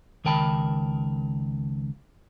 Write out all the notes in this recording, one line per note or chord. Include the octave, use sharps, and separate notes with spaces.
C#2 D#3 A#4 G5 A5 B5